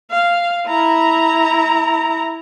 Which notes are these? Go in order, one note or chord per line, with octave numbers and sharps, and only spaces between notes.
F5
E4 A#5